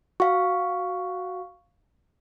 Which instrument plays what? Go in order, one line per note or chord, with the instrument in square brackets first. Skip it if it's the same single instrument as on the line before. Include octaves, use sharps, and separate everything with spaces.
[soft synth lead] F#4 [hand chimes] F5 C#6